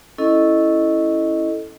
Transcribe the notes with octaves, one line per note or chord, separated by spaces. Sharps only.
C#4 E4 A4 D#5